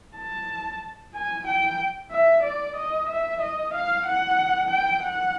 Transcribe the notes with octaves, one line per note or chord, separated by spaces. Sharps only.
A5
G#5
G5
E5
D5
D#5
E5
D#5
F5
F#5
G5
F#5